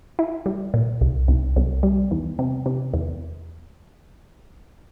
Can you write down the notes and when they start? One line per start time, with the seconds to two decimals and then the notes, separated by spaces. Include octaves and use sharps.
0.19 E4
0.46 G3
0.74 A#2
1.01 C2
1.28 C2
1.56 C2
1.83 G3
2.11 E2
2.39 C3
2.66 C3
2.94 E2